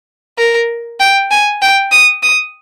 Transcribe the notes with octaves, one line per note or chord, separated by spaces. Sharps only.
A#4
G5
G#5
G5
D#6
D#6